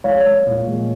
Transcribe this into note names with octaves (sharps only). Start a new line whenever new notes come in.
G#3 C#5 F5
G#3
A#2
G#3